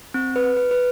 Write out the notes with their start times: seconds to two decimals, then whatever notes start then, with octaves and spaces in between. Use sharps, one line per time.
0.14 C4
0.36 B4
0.57 B4
0.71 B4